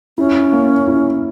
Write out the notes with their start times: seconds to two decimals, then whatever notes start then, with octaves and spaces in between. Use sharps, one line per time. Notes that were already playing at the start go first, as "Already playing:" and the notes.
0.18 C#4 E4
0.52 A#3
0.87 E4